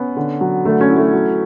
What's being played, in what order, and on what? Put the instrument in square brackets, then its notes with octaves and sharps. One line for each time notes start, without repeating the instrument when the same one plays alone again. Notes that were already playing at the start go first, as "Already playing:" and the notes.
Already playing: [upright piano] B3 [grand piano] C#4
[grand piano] D3
F#3
[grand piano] D3 [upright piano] A3
[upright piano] C#4
[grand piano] E4
[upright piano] A3
[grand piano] F#3